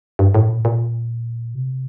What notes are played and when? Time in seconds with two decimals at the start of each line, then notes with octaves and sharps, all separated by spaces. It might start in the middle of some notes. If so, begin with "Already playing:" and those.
0.19 G2
0.35 A2
0.49 A#2
0.65 A#2
1.55 C3